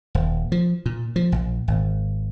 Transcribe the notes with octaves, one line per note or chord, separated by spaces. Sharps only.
D#1
F3
A#2
F3
A#1
G#1